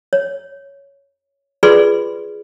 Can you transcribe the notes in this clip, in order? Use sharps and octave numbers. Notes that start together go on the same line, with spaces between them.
C#5
F4 G#4 B4 D5 C6